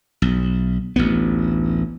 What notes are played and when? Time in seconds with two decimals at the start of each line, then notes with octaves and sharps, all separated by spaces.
0.22 B1
0.96 A1 D2 B3